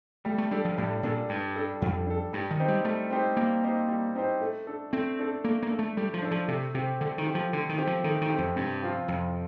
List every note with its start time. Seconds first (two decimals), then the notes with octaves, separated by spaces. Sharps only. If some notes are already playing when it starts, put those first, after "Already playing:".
0.25 G3 A3
0.38 A3
0.51 G3 D4 A4
0.65 F3
0.77 A2 G3
1.03 A#2 D4 A4
1.29 G2 G3
1.56 D4 A4
1.81 F2 G3
2.07 D4 A4
2.33 G2 G3
2.51 D#3
2.60 C4 D#4 G4 C5
2.68 G3
2.84 G3 A3
3.10 C4 D#4 G4 C5
3.37 G3 A#3
3.63 C4 D#4 G4 C5
3.88 G3
4.15 C4 D#4 G4 C5
4.41 A3
4.67 D4 A4
4.93 A3 C4
5.19 D4 A4
5.44 A3 A#3
5.62 A#3
5.70 D4 A4
5.79 A3
5.97 G3 A3
6.14 F3
6.22 D4 A4
6.31 F3
6.48 C3 A3
6.74 C3 C4 G4
7.00 D3 A3
7.18 D#3
7.26 C4 G4
7.35 F3
7.53 D3 A3
7.69 D#3
7.78 C4 G4
7.87 F3
8.04 D#3 A3
8.21 D#3
8.30 C4 G4
8.38 F2
8.56 G2 C3
8.83 F3 C4 F4
9.08 F2 C3